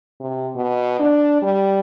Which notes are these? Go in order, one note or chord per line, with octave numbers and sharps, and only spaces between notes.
C3
B2
D4
G3